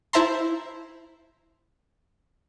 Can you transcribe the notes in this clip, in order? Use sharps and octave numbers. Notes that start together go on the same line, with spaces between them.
E4 C5 E5 A5 A#5 C6